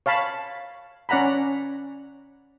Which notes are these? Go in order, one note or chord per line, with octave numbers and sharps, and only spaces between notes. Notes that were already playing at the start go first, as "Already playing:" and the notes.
C#5 F5 A5 B5
C#4 D5 F#5 A#5 B5